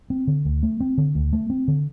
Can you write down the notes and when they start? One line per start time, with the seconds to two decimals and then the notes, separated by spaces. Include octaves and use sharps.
0.10 C4
0.27 D3
0.45 D2
0.63 A3
0.80 C4
0.98 D3
1.15 D2
1.33 A3
1.50 C4
1.68 D3